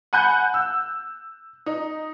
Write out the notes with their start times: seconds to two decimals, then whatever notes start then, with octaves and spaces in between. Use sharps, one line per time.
0.13 F#5 G#5 B5 F#6 G6
0.54 E6
1.66 D#4